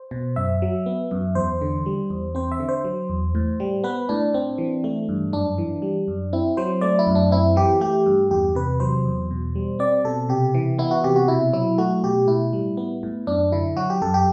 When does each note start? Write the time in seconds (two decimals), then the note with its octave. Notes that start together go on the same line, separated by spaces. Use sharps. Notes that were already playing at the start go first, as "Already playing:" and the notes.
Already playing: C5
0.11 B2
0.36 F#2 E5
0.62 F#3
0.86 B3
1.11 F#2
1.35 E2 C5
1.61 D3
1.86 G3
2.10 E2
2.35 C4 C5
2.52 E5
2.60 D3
2.69 C5
2.84 F#3
3.09 E2
3.35 A2
3.60 G3
3.84 B3 B4
4.09 A2 D4
4.34 C4
4.58 E3
4.84 A3
5.09 G2
5.33 F#2 D4
5.58 E3
5.82 G3
6.08 F#2
6.33 C4 E4
6.57 F#3 C5
6.81 A3 D5
6.99 E4
7.07 F#2
7.15 D4
7.31 C4 E4
7.56 E3 G4
7.81 A3 G4
8.06 G2
8.31 E2 G4
8.55 C3 B4
8.80 F#3 C5
9.05 E2
9.31 B2
9.55 G3
9.79 C4 D5
10.05 B2 A4
10.29 C3 G4
10.54 E3
10.79 B3 E4
10.91 F#4
11.04 C3 G4
11.16 F#4
11.28 B2 E4
11.53 F#3 E4
11.78 A3 F#4
12.04 B2 G4
12.27 A2 E4
12.53 G3
12.77 B3
13.03 A2
13.27 F#2 D4
13.52 D3 E4
13.77 F#3 F#4
13.90 G4
14.02 F#2 A4
14.14 G4